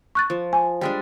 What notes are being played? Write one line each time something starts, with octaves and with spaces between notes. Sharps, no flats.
C#6 F#6 A6
F3
G#5
G3 G#3 D4